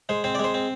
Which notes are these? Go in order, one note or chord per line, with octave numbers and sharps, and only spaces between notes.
G#3 C5
C4 C5
D5
G#3
C5
C4